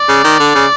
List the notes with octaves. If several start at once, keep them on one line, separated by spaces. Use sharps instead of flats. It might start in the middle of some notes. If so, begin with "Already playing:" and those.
Already playing: D5
C#3
D#3
D3
C#3